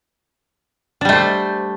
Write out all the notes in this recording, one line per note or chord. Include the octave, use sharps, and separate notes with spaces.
G3 A3 D4 C5